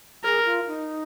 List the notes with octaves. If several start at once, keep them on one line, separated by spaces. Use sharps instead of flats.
G#4 A#4
F4
D#4